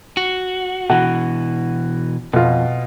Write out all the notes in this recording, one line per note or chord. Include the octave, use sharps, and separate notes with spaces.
F#4
B2 E3 F#4
F2 B2 F4